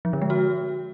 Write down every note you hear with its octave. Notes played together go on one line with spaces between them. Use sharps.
F3
D3
G#3
F#4